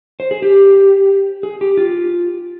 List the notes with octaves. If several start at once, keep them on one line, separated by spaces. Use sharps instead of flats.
C5
G#4
G4
G#4
G4
F4